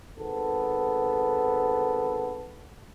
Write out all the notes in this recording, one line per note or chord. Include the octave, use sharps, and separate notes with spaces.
G#1 B3 A4